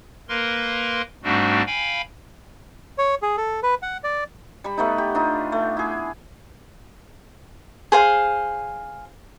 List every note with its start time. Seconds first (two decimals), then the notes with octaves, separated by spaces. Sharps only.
0.29 A#3 A#4 B4 C6
1.24 G#2 G3 A3 C4 D4 F#4
1.67 F5 G5 G#5 B5
2.98 C#5
3.22 G#4
3.37 A4
3.63 B4
3.82 F#5
4.04 D5
4.64 G3 B5
4.77 A3 B3 D#4
4.98 G4
5.15 D4 D#4 F4
5.52 A3
5.77 E4 G#4
7.92 G#4 C5 F5